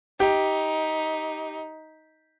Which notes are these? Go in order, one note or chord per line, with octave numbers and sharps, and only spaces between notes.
D#4 G4